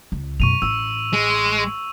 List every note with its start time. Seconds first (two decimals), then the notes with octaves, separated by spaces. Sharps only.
0.12 C#2
0.40 F#2 B2 C#6 D#7 F7
0.62 A1 E6
1.13 G#3